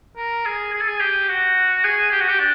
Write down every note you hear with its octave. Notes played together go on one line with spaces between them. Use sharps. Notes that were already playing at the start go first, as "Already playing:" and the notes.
A#4
G#4
G#4
A4
G#4
G4
F#4
G#4
G4
F#4
G4
D4